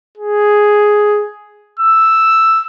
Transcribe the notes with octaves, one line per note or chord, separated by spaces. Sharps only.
G#4
E6